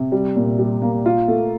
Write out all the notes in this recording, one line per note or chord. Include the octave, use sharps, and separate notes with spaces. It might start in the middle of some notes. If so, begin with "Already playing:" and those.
Already playing: C3
G3
A#2
G3
A#3
F4
A3